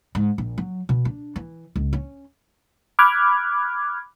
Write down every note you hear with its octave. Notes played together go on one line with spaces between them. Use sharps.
G#2
A#1
F#3
B2
D4
E3
C#2
C#4
B5 D6 F6 F#6 G#6